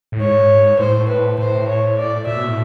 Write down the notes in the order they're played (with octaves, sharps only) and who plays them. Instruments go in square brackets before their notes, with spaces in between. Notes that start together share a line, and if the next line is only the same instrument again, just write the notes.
[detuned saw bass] A2
[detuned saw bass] G#2 [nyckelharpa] C#5
[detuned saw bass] A2 [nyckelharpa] C5
[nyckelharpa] B4
[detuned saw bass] A2 [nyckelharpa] C5
[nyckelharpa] C#5
D5
[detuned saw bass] A#2 [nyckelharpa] E5
[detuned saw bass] B2
A2